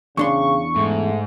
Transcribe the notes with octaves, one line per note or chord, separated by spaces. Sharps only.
E2 C#3 D4 C6 C#6
G#2 A3